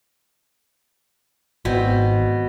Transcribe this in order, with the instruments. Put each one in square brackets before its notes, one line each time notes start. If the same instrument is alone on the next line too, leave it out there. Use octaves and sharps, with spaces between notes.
[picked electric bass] G#1 [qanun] B2 C4